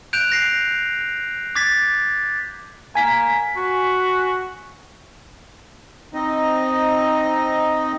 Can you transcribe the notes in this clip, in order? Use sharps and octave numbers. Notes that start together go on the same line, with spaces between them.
F#6 G6 D7 E7 F7
F#6 A#6 C7
D6 G#6 A6 B6
A#3 G#5 B6
F#4
C4 D#4 D#5